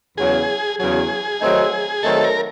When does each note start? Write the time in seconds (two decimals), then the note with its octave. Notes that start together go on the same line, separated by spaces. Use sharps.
0.17 E2 C#3 F#3 G#4
0.79 E2 C#3 F#3 G#4
1.41 D#3 F#3 A3 C4 D#4
2.03 D#3 F#3 A3 C4 D#4 A4
2.24 A#4